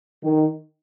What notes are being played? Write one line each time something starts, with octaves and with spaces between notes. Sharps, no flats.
D#3